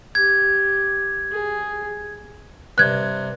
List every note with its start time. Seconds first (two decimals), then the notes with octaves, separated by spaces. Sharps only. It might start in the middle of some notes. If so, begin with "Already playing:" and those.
0.15 G4 G#6
1.31 G#4
2.78 G2 C3 F#6 G#6